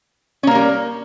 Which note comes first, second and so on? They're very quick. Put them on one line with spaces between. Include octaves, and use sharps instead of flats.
C#4 A#3 A#4 G3